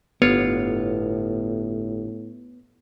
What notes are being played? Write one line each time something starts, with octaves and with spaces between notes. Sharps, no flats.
G1 A2 B3 F4 C#5